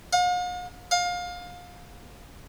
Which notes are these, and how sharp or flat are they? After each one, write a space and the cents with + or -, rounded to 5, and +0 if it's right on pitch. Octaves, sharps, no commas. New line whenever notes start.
F5 +45
F5 +25